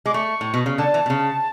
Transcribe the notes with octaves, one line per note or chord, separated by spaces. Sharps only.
G#3 D6
A3 C#6
A2
B2
C#3
D3 A5
E3
B2
C#3